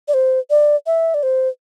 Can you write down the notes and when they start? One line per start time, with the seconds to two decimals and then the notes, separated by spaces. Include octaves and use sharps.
0.08 D5
0.14 C5
0.50 D5
0.87 E5
1.14 D5
1.23 C5